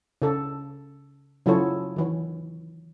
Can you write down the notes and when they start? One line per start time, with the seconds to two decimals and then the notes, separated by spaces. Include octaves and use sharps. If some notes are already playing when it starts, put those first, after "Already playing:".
0.22 C#3 A4
1.46 C#3 F#3 E4 F4 A4 C#5
1.96 D#3 E3 C#5